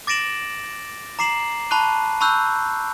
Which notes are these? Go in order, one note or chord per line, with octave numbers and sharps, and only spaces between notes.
D6 A6 A#6 D7 E7 F#7
A#5 D6 C7 E7 F#7
A5 B5 C#6 F#6 D#7
A5 B5 C#6 E6 F#6 G6